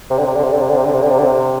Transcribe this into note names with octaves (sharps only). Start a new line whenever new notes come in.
C3
D3
C3
D3
C3
D3
C3
D3
C3
D3
C3
D3
C3
D3
C3